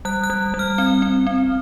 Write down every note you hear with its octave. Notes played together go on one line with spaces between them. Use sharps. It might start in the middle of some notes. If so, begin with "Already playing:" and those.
G3 F#6
F#6
G3
G3
F6
C4 F6
C4
C4